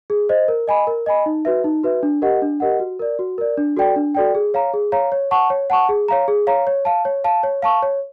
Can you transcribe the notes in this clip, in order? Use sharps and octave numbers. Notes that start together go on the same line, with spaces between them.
G#4
C5 D#5
A#4
D#5 G#5 B5
A#4
D#5 G#5 B5
D#4
F#4 B4 E5
D#4
F#4 B4 E5
D4
G4 A#4 D#5 F#5
D4
G4 A#4 D#5 F#5
F#4
A#4 D5
F#4
A#4 D5
D4
F#4 A4 D5 G5
D4
F#4 A4 D5 G5
G#4
C#5 F5 A#5
G#4
C#5 F5 A#5
C#5
F#5 A5 C#6
C#5
F#5 A5 C#6
G#4
C#5 F5 A#5
G#4
C#5 F5 A#5
C#5
F5 A5
C#5
F5 A5
C#5
F5 A5 C#6
C#5